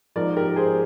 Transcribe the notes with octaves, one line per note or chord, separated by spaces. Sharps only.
G#2 F3 A#4 D5
G4 A#4
G#4 C5